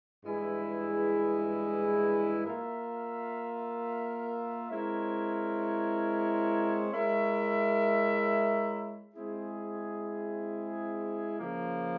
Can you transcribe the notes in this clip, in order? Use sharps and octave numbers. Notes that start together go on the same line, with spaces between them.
G2 E3 G#3 E4 G#4
A#3 F4 A#4 E5
G#3 C4 E4 A#4 C#5
G#3 E4 A#4 C#5 E5
G#3 C4 E4 G#4
C#3 F3 A#3